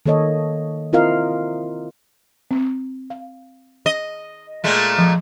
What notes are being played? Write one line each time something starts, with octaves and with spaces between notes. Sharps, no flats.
D#3 A#3 A4 C#5 D#5
C4 E4 F4 A#4 D#5 F5
C4
F5
D#5
A#2 G#3 A3
F3